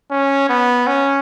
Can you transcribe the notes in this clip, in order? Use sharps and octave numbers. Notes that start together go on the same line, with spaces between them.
C#4
B3
C#4